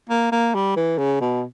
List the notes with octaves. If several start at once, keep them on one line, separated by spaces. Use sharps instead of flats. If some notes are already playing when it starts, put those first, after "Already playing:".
A#3
A#3
G3
E3
C#3
B2